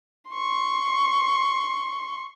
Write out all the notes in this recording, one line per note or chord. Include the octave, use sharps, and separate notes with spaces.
C6 C#6